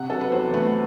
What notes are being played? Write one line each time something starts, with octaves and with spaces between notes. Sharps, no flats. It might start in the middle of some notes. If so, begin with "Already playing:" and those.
Already playing: C3 F#5
F#3 A4
B4
E2 C5
A3 B4